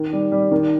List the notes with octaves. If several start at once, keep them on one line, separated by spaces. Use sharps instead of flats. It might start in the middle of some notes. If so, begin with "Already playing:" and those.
Already playing: D#3
G3
G3
D#3